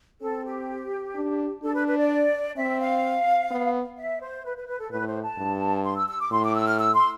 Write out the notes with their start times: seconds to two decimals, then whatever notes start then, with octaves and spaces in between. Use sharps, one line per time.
0.21 C4 A4
0.45 G4
1.15 D4
1.63 D4 A4
1.74 B4
1.87 B4
1.97 D5
2.56 C4 E5
2.79 F5
3.51 B3
3.97 E5
4.21 C5
4.44 B4
4.56 B4
4.67 B4
4.79 A4
4.91 A2 B4
5.07 C5
5.23 A5
5.38 G2
5.84 C6
5.96 E6
6.07 E6
6.20 D6
6.31 A2 C6
6.43 D6
6.55 E6
6.67 F6
6.79 E6
6.94 C6